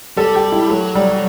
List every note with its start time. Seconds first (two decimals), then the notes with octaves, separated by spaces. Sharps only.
0.17 G3 A4
0.35 G4
0.52 E4
0.69 F#3 A3
0.95 G3